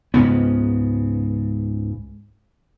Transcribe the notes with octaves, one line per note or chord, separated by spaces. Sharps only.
C#2 G#2 C#3 B3